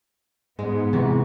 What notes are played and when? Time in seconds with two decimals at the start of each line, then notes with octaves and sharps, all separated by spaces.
0.59 G#2 G#3 B3
0.93 G#2 C3 E3 F#4